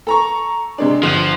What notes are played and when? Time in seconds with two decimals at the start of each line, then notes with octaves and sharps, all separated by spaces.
0.07 A4 A#5 C#6
0.78 C3 G#3 D4
1.03 G1 F3 F#6 D#7